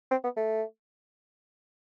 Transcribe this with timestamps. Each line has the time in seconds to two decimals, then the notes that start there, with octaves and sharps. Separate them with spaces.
0.11 C4
0.24 B3
0.37 A3